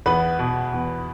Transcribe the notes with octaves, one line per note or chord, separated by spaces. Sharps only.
E2 B3 B4
B2
E2